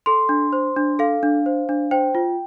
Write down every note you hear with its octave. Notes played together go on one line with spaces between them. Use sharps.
A4 C6
D4
C5
D4
A4 F5
D4
C5
D4
C5 G5
F4